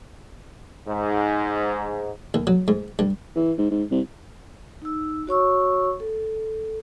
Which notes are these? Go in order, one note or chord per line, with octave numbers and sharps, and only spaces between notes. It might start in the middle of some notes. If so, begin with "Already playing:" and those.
G#2
D#2
F#3
G#2
G2
E3
G#2
G#2
C2
D#4 E6
F#4 C#5 C#6 E6
A4